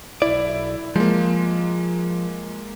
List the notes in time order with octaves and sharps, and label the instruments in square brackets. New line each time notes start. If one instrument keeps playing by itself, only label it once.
[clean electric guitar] B1 D5 [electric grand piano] E4
[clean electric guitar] F3 [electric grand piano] G#3 A#3